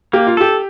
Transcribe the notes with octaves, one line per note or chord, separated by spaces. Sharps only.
A#3 G4
F4
G4 A4